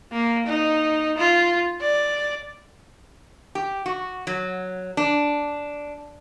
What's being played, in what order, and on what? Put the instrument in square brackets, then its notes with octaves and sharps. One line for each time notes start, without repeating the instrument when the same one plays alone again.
[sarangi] A#3
D#4
F4
D5
[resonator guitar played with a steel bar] G4
F#4
F#3
D4